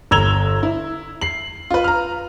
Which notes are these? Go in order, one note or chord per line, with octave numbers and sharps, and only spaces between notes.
G1 A#5 E6 G#6 F7 G7
E4
C7 F#7
F4 B4
A#5 F6